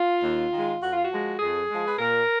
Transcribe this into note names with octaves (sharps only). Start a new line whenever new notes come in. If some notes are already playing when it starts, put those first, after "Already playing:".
Already playing: F4
D#2
D#3 G#3
F2 F#4
F4
F#4
F3 G#3
F2 G#4
F3 G#3
B4
A#2 A#4